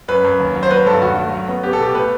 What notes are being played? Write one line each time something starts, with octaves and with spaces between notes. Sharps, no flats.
F#2 B4
F#2
D#2
F#3
C5
F#3 B4
G2 A4
D#2 F#4
A3
F#3
B3
B3 G4
A4
B2 G4
A3 B4